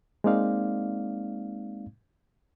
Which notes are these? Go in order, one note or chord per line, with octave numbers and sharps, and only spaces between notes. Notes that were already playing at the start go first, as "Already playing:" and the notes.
G#3 A#3 C4 D#4 D5 F5